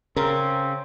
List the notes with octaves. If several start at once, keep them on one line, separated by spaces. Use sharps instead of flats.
C#3 C4 A#4